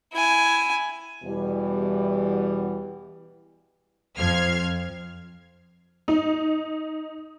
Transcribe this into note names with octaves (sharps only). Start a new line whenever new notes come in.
E4 G#5
E2 B2 E3 G3
F2 F3 F6 G#6 C7
D#4